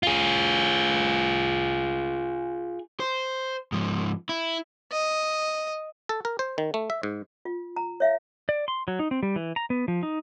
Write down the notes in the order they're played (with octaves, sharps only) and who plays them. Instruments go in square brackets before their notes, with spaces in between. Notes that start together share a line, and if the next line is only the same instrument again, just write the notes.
[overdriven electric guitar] F4 G#4
C5
G#2 F3
E4
[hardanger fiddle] D#5
[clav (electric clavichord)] A4
A#4
C5
D#3
A3
E5
G#2
[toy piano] F4
A#5
C#5 E5 F5
[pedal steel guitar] D5
C6
F#3
D#4
C4
G3
E3
A#5
B3
F3
D#4